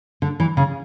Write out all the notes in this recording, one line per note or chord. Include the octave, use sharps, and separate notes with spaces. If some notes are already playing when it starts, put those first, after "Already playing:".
D3
E3
C#3